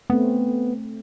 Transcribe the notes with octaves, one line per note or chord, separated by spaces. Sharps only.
A3 B3 C4